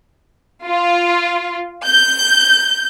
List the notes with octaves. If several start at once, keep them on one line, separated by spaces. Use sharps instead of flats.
F4
G6